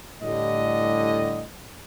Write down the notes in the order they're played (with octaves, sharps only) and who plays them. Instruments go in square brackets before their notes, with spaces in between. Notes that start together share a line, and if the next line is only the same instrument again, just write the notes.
[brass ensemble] A2 D3 G3 D#5